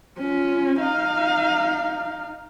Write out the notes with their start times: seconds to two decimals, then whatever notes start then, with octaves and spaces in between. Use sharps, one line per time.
0.19 C#4 F4
0.80 D#4 F5